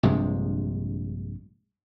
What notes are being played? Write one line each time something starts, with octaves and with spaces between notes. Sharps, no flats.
A#1 G2 C3 G#3